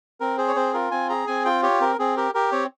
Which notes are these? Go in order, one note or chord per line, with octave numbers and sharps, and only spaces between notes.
C4 A#4
G#4 C5
C#5
C4 C5
F4 A#4
C4 G#5
G#4 A#5
C4 G#5
F4 G5
G4 C#5
C4 A#4
C4 G#4
G4 A#4
G4 A#4
C4 C#5